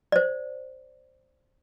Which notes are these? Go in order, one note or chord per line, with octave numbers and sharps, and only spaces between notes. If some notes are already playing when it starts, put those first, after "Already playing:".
C5 D5